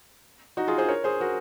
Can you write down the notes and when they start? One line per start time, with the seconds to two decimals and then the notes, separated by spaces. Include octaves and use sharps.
0.57 D#4 F#4
0.68 F4 G#4
0.78 G#4 C5
0.88 A#4 C#5
1.04 G#4 C5
1.21 F#4 A#4